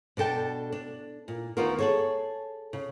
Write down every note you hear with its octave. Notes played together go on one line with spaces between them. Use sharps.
B2 D4 A4 G5 A5
D4
A#2
D2 D#3 B3 F4 F#4 A#4
G#4 A4 C#5
C#3